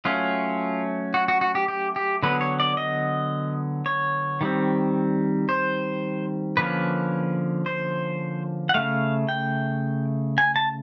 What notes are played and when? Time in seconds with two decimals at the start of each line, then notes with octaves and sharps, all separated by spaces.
0.05 F#3 A3 C#4 F4
1.14 F#4
1.28 F#4
1.41 F#4
1.55 G4
1.68 G4
1.96 G4
2.23 D3 F#3 B3 B4
2.41 C#5
2.60 D5
2.77 D#5
3.86 C#5
4.41 D#3 G3 C4
5.49 C5
6.57 D3 F3 A#3 C#4 B4
7.66 C5
8.69 F#5
8.74 C#3 F3 A3 F5
9.29 G5
10.38 G#5
10.56 A5